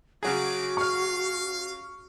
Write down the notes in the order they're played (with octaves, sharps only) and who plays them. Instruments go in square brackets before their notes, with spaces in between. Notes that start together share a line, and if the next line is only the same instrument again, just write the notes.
[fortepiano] C#3 F#3 G#4 [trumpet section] D4 D#4 D6 [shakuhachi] F#4
[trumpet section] F5 [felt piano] C#6 F6